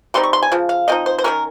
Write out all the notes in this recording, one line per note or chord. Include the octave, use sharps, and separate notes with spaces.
C3 G3 C4 D#4 C6
C#6
C6
G#5
C#3 F3
F5
F3 C4 D#4 D#5
C5
C5
D#3 G3 C#4 A#4